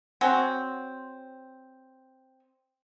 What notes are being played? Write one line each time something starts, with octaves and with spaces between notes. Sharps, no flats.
C4 F#4 C#5 G#5